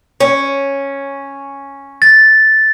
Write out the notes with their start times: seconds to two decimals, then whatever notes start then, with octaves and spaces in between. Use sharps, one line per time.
0.20 C#4
2.02 A6